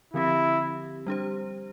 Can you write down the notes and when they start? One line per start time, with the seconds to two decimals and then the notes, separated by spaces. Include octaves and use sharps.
0.13 D3 F3 C4 E4 G4
1.07 G3 D4 G4 C5